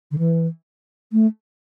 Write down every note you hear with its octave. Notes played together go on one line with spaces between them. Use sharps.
D3
E3
A3